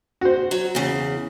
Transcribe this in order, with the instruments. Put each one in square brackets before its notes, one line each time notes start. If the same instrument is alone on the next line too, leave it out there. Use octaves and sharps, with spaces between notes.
[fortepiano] F#4 C5
[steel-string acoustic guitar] F#3
E2 C#3